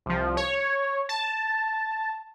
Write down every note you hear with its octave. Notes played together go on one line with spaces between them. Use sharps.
C2 F3
C#5
A5